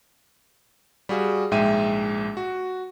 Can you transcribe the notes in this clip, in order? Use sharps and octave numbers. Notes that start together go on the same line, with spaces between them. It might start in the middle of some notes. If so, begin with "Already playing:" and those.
G3 F#4 G#4 F5
A#1 G#2 G#3 E5 G5 D#7
F#4